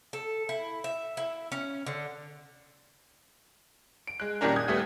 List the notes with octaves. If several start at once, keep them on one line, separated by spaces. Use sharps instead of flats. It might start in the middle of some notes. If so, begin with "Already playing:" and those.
A4
E4
E5
E4
C#4
D3
D7
G#3 F#6
A#2 D#3 G3 C#4 D4 A#4
D#6 G6 G#6
D#2 G3 A3 B3